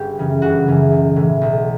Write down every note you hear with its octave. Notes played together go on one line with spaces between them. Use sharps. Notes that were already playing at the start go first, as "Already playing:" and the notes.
Already playing: G1 G4
F#2 C#3 E3
G1 F#4
F#2 C#3 E3
B1
A2 E3
B1